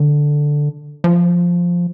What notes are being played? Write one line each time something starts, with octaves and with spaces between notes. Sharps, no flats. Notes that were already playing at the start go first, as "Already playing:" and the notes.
Already playing: D3
F3